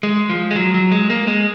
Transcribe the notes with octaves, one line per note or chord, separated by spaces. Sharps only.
G#3
F3
G#3
F#3
F#3
G#3
A#3
G#3